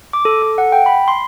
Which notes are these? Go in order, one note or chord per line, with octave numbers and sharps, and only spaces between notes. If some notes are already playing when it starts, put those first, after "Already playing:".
D6
A4
A4
F#5
G5
B5
C6